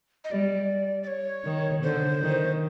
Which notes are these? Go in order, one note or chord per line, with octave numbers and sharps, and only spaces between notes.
D#5
G3 D5
D5
C#5
D#3
D3 C5
D#3